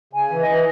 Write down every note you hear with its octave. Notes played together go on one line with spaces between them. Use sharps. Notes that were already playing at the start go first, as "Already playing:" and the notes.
C#3 G#5
E3
D#5
E3